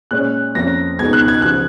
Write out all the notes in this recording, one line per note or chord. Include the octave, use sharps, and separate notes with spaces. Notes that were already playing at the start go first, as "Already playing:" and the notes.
A#2 G#3 C#4 F#6
F2 F3 A#3 C#4 A#6
C#2 B2 G#3 D#4 G#6
F#6
G#6
C#3 F3 F#6